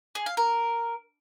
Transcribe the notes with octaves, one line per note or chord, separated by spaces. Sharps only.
G#4
F5
A#4